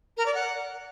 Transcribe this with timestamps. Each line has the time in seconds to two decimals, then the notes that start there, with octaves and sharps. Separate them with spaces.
0.17 A#4
0.25 D5
0.34 F#5